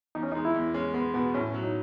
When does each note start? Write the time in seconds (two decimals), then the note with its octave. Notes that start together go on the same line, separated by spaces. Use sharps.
0.15 E2 D#4
0.23 C#4
0.32 G#3 D#4
0.45 E4
0.54 E2
0.74 G#3 C#4
0.94 G#3 B3
1.14 B2 B3
1.34 A2 C#4
1.54 F#3
1.63 D#4